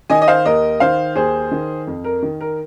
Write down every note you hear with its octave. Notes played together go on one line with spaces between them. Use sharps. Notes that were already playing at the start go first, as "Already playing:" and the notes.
D#3 D#5 G#5
D#5
C5 F5
D#2 A#4 D#5
D#3 C5 F5
D#2 G#4 C5
D#3
F2
A#4
D#3
A#4